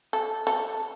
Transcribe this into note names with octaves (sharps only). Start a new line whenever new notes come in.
A4
A4